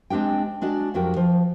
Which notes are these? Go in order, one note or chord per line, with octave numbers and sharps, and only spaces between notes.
G#3 C4 D4 G4 G5
G#3 D4 F#4 D5
F2 F#3 F#4 G4 A#4 G5
F3